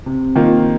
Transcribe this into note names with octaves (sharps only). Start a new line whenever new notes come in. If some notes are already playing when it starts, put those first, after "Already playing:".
C3
D#3 A#3 F4